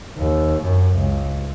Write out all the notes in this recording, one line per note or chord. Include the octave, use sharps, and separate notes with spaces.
D#2
F#2
C#2